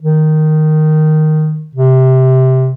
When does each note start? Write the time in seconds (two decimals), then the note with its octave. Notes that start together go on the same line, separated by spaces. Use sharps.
0.02 D#3
1.75 C3